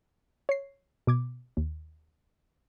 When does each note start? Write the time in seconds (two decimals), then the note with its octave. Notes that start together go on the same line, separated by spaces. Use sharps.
0.49 C#5 C7
1.07 B2 D6 G#6
1.57 D#2